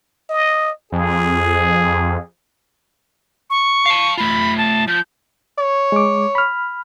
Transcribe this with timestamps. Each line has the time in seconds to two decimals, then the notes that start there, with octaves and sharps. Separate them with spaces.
0.30 D#5
0.92 F2 G#4
3.50 C#6
3.86 F5 A5
4.17 A3 F4 B5
4.58 A5
4.88 F3 G6
5.58 C#5
5.92 G#3 D6
6.35 B5 F6